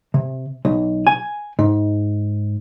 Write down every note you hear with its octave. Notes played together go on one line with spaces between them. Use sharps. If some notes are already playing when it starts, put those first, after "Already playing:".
C3
B1
G#5
G#2